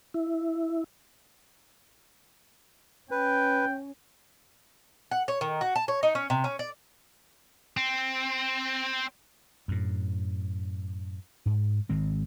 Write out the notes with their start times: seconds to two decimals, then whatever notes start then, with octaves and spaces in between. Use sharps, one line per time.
0.14 E4
3.11 C#4 B4 G5
5.11 F#5
5.28 C#5
5.41 D#3
5.61 F#4
5.76 A5
5.88 C#5
6.03 D#4
6.15 C#4
6.30 C3
6.44 C#4
6.59 D5
7.77 C4
9.68 F#2 A2
11.46 G#2
11.89 G#1 D#3 G#3 C4